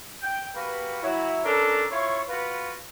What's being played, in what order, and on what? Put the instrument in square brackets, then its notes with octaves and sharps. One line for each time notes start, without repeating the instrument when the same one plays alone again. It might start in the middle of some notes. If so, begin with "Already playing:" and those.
[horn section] G5
A#3 F#4 G4 B4
F#3 E4
C#4 D4 A4 A#4 A#5
E4 F4 C#5
F4 F#4 B4